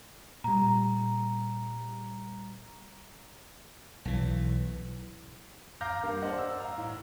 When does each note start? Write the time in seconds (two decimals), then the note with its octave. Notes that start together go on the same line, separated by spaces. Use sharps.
0.44 A#2 G3 A#5
4.05 B1 E3
5.81 F5 A#5 D6 F6 G6 A#6
6.03 G2 A#3
6.22 D4 C5 D#5 F#5
6.38 E6
6.60 F5 A#5
6.78 A2